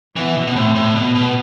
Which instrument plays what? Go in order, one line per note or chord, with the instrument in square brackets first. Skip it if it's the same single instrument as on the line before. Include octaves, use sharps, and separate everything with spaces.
[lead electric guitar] E3 [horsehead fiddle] B3
[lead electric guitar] B2
B2
[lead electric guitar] A2 [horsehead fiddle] C4
[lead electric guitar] A2
[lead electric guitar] B2 [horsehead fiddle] B3
[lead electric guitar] B2